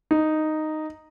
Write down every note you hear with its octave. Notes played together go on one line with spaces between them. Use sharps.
D#4